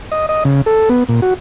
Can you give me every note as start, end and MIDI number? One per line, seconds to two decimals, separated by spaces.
0.12 0.26 75
0.29 0.44 75
0.45 0.61 49
0.66 0.89 69
0.89 1.04 59
1.09 1.20 46
1.22 1.34 66